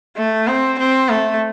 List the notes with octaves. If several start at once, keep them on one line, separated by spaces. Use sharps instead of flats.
A3
C4
C4
A3